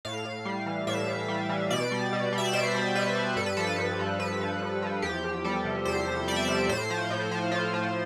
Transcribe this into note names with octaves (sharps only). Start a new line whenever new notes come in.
A2 F5
A2
G3
E3
A2 E5
A2
G3
E3
B2 D5
G3
B2
G3
E5
D5
B2 C5
G3
B2 B4
G3
G2 A4
B4
F3 A4
B4
G2 A4
F3
G2 B4
F3
G2
F3
E2 G4
E2
G3 A4
C3
E2 C5
E2
G3 D5
E5
C3 D5
A2 C5
F3
A2
F3
A2 F4
F3